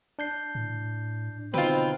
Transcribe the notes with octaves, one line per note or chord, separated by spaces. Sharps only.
D4 G6 C7
A2
B2 D3 C4 D#4 F4 B4